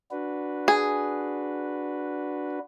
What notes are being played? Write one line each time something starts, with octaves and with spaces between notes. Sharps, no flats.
D4 F#4 B4
G#4